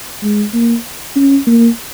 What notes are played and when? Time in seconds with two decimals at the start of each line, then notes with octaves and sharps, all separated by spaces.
0.23 G#3
0.54 A#3
1.16 C#4
1.47 A#3